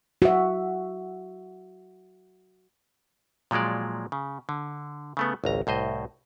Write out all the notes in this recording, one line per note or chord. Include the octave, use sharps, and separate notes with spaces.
F#4 E5
A#2 F3 F#3 G#3 D5
C#3
D3
C#3 A3 B3
G#1 C#2 A#5
C2 A2 C5 D#5